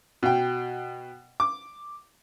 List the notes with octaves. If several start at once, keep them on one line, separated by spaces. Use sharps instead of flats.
B2 G5
D6